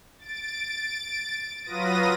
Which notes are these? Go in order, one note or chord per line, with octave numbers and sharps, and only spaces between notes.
A6 D7
F#3 F4 B4 D#6 A#6 D#7